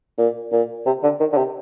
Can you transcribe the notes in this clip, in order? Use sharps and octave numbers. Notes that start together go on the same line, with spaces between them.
A#2
A#2
C3
D3
D#3
D3
C3